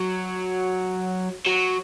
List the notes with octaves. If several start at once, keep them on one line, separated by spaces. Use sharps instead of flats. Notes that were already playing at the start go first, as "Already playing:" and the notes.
Already playing: F#3
F#3